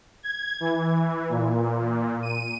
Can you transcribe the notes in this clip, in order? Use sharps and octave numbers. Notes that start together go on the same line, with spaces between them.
G#6
E3
A#2
D#7